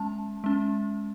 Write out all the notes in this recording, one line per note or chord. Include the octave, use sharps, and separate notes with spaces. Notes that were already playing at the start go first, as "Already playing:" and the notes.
Already playing: G#3 C#4 A5
G#3 C#4